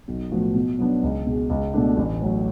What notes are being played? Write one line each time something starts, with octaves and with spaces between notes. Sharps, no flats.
B1
A2 F3 B3 F#4
B2
F#3 B3 D4
C#2
B2 G#3
C#2
B2 A3 D4
A1
A2 F#3